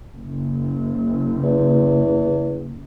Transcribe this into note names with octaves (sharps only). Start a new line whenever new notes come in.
F#1
E2